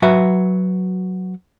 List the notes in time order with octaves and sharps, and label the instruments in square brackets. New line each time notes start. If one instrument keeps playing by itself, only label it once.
[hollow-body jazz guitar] F#3 F#4 B4 E5